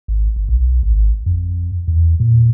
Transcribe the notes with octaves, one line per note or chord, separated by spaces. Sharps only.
G#1
G1
B1
G#1
F2
E2
A#2